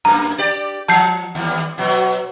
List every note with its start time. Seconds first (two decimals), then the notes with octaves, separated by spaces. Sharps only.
0.05 F#2 A#3 A#5
0.38 G4 D5
0.88 F3 A5 G6 C7
1.35 D#2 G3
1.78 B2 F#3